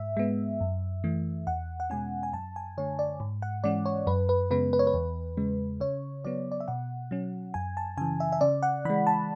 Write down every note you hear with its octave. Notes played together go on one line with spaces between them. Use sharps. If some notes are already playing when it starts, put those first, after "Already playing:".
Already playing: G#2 E5
G#3 B3
F#2
E3 A3
E2 F#5
F#5
B2 G#3 C#4 G#5
G#5
F#2 A5
G#5
D3 A3 C#5
D5
G#2
F#5
E3 G#3 C#4 D5
C#5
F#2 B4
B4
C#3 G#3 B3 B4
B4
C#5
B4
E2
C#3 G#3
C#3 C#5
F#3 B3 D5
D5
E5
B2 F#5
F#3 C#4
F#2 G#5
A5
C#3 E3 G#5
E5
E5
C#3 D5
F#5
E3 G#3 B5
A5